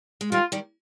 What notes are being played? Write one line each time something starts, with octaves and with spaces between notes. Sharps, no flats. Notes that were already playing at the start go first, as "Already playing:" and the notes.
G#3
D#3 G3 F4
D#3 G3